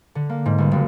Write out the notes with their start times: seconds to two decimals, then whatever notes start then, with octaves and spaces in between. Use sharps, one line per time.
0.15 D3
0.29 A#3
0.46 G#2
0.58 G1
0.72 F#1